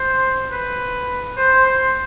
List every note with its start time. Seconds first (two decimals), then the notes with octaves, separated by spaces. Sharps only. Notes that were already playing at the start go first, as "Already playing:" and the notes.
Already playing: C5
0.52 B4
1.37 C5
1.66 C5